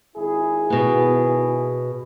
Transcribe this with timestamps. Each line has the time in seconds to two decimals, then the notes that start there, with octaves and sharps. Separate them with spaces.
0.17 G#1 E4 G#4
0.70 B2 B3